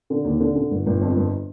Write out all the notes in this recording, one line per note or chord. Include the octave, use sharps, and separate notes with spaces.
D3
D#2
D3
D3
G1
G1
F2
G1